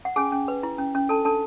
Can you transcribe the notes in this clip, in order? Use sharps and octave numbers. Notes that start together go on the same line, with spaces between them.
F#5
C#4 G#4 G#5
C#4
B4
E4
C#4
C#4
D4 A4 A5
D4 A4 A5